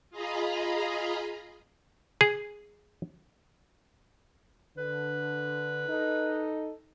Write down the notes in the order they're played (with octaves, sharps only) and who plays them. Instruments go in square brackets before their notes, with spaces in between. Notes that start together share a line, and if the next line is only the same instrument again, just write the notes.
[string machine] F4 G#4 D#5 F5 A#5 B5
[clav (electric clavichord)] G#4
[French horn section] D3 [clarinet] B4
[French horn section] D#4 A4 D#5